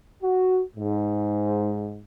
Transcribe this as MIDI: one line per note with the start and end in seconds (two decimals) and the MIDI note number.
0.22 0.61 66
0.76 2.01 44